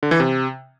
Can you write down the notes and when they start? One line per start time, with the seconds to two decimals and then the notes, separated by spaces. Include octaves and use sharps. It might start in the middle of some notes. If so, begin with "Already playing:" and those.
0.03 D3
0.11 E3
0.20 C3